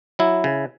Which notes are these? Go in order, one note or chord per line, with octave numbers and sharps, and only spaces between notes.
F#3 E4
C#3